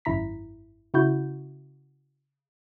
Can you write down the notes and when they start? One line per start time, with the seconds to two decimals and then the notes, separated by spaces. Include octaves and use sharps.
0.05 G#1 F#2 E4 A#5 B6
0.94 C#3 E4 F#4 G6